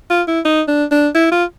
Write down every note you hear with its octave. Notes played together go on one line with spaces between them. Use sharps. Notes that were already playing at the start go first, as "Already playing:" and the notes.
F4
E4
D#4
D4
D4
E4
F4